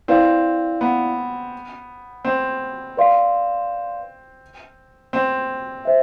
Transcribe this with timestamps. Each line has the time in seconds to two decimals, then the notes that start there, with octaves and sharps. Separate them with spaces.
0.08 C4 E4 B4 D5 F5
0.81 B3
2.25 C4
2.97 B4 D5 F5 C6
5.13 C4
5.85 C5 E5